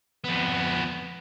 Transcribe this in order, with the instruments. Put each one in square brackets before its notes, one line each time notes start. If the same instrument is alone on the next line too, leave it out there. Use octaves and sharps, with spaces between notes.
[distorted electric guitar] F2 B3